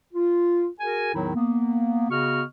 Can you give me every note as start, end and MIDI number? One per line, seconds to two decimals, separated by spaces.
0.13 0.67 65
0.80 1.12 66
0.80 1.12 68
0.80 1.12 70
0.80 1.12 80
1.15 1.33 40
1.15 1.33 45
1.15 1.33 51
1.15 1.33 54
1.15 1.33 63
1.15 1.33 64
1.35 2.09 58
1.35 2.09 59
2.10 2.43 49
2.10 2.43 59
2.10 2.43 66
2.10 2.43 75
2.10 2.43 85
2.10 2.43 89